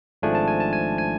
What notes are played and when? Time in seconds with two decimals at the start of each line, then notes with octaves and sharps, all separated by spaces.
0.22 G#1 G#2 F3 A3 D4 G#5
0.35 A5
0.48 G#5
0.60 A5
0.73 G#5
0.98 G#5